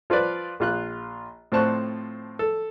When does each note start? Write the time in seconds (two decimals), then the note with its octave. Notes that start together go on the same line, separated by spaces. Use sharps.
0.10 F3 F4 B4 D5
0.60 A#1 F4 F#6
1.52 A2 F3 C4 A5 C#6 F#6
2.39 A4